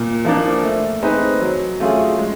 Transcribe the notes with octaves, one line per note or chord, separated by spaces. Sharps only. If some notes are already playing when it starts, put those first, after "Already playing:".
Already playing: A#2
F3 A#3 D4
A3
C4 D#4 G#4 B4
F#3
A3 C#4 F4 G#4
G#3